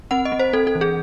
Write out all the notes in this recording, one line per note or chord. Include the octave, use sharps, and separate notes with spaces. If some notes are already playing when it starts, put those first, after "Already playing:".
C4 F#5
D#5
C4
C5
C4 A4
A4
E3
G#4